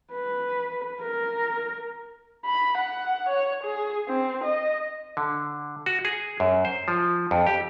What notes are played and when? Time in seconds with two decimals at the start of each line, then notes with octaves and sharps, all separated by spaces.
0.13 B4
1.02 A#4
2.46 B5
2.77 F#5
3.29 C#5
3.63 G#4
4.08 C4
4.44 D#5
5.17 D3
5.86 F#4
6.05 G#4
6.40 F#2
6.65 C5
6.88 F3
7.31 F2
7.47 G4